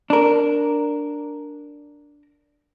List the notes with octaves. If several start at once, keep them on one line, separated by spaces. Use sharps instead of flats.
D4 A#4